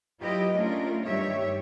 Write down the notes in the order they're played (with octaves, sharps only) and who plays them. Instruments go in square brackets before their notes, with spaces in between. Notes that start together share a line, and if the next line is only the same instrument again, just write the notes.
[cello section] F#3 E4 F4 G4 B4 D#5
A3 C#4 D4 F4 A#4
G2 D#3 G3 G4 C#5 E5